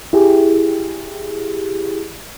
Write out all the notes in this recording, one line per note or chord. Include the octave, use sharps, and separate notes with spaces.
E4 G4 G#4